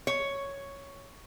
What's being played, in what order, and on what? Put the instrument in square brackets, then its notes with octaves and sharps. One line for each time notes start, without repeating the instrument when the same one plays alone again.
[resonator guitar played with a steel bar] C#5